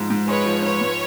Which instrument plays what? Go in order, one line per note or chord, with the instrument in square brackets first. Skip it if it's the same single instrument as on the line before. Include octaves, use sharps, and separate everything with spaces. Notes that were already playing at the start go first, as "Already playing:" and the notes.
Already playing: [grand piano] G#2 F3 G#3
G#2
[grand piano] G#3 [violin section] B4 C#5
[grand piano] F3
[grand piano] G#2 [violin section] B4 C#5
[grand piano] G#2